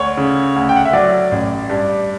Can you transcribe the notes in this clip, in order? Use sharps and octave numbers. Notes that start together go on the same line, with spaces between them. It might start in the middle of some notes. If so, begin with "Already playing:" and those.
Already playing: D2 C#5
C#3
D2
G5
F#5
E5
F#3 D5
A1
G2